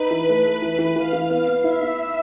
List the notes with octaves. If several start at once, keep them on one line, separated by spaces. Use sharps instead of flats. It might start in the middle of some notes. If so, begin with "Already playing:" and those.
Already playing: D#4 B4
E3
A3
A3
E3 B4
E3
E3 F5
E3
B3 F5
B3
E4 E5
E4